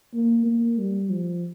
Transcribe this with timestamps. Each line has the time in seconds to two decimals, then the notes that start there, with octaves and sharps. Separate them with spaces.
0.14 A#3
0.46 A#3
0.78 G3
1.10 F3